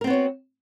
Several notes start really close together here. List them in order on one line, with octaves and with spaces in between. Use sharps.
A#4 C4 B3 C#5 F#4